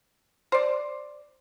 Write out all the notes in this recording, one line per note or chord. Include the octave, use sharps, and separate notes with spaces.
C5 D5